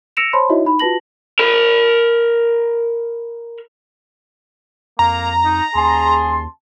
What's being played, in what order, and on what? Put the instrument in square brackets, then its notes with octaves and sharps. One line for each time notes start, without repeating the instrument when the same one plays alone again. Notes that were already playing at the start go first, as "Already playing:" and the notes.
[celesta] E6 A#6 C#7 D7 E7 F7
C5 C#5 A5 B5 C6
D#4 E4 F#4 C#5 D#5 E5
D#4 B5
F4 F#4 B4 A5 A#6 F#7
[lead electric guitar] A#4 B5
[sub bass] F2 [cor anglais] A#3 [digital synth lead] A#5
[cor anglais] D#4
[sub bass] D#2 [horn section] C#3 A5 C6 [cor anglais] G#4